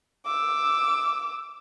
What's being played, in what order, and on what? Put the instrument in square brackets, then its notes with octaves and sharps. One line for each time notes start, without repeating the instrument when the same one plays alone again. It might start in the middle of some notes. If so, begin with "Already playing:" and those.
[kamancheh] D6 E6